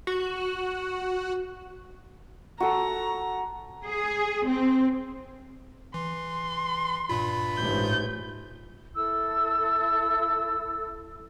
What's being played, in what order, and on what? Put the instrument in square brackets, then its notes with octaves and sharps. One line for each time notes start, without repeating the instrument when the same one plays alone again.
[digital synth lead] F#4
[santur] F#4 A4 [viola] A#5
[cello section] G#4
C4
[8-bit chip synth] E3 [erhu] C6
[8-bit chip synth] G2 A#2 F4 [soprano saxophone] B5
[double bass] A1 G#2 [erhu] G6
[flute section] E4 A4 E6